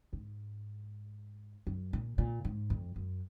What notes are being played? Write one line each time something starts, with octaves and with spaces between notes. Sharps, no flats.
G#2
F#2
A#2
A#2
G#2
F2
F#2